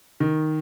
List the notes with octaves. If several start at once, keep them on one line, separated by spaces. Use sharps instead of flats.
D#3